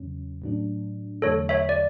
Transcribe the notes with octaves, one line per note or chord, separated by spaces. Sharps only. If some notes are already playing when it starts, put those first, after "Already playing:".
Already playing: E2 C#3 F#3 C#4
A2 F#3 A3 D4
E2 D3 F#3 A3 A4 C#5
C#5 E5
D5